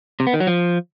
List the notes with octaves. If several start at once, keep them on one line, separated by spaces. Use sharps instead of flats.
C3
B3
D#3
F#3
F3